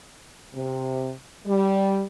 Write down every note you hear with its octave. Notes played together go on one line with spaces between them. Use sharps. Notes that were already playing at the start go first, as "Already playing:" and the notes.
C3
G3